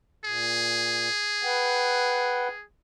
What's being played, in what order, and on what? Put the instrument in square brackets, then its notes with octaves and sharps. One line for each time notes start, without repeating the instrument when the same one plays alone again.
[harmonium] A#2 [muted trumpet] G#4
[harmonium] B4 F#5 G5